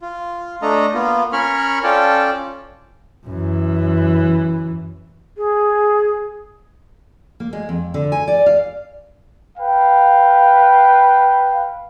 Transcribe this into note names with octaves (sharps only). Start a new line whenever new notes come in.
F4
A3 D4 A4 D#5 A#5
A#3 B3 F4
C#4 A#4 C#5 B5 C#6 F6
C#4 F4 A4 D5 G5 A5
F#2 E3
G#4
A#3
G#3
F2
D3
G#5
D5
F5
B4 F5 G5